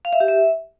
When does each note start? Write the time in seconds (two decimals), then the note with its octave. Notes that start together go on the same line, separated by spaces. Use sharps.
0.05 F5
0.13 E5
0.20 G4
0.28 E5